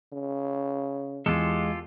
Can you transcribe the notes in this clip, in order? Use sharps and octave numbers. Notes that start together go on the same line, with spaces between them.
C#3
E2 G#3 F4 G4 A4